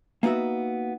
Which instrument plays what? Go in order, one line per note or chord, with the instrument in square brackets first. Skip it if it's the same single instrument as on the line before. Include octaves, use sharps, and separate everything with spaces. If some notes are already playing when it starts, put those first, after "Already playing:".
[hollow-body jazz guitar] A#3 B3 D#4 F#4 E5